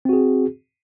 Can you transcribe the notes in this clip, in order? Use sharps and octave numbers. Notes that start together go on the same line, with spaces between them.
C4 F#4 G#4